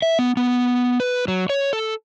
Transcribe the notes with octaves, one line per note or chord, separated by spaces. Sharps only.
E5
B3
B3
B4
F#3
C#5
A4